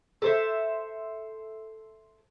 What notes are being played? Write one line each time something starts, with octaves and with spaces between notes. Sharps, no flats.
A4 C5 E5